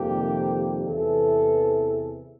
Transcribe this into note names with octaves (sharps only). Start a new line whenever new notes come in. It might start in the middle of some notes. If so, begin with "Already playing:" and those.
Already playing: F2 C3 D#3 G3 A#3 G4
E2 C3 E3 A4